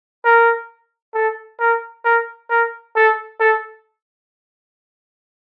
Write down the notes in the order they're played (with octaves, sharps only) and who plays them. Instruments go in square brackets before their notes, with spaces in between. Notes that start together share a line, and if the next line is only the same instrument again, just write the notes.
[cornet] A#4
A4
A#4
A#4
A#4
A4
A4